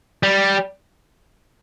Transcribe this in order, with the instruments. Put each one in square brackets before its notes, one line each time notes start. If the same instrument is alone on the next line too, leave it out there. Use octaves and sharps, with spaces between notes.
[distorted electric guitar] G3